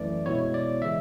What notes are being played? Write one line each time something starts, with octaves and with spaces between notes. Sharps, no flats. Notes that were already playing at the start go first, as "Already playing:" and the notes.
Already playing: F#2 E3 A3 D5
B2 G#3 B3 E4 C#5
D5
C#3 E3 G#3 E5